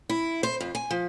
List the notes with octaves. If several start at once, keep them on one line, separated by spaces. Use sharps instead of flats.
E4
C5
F2
G#5
F3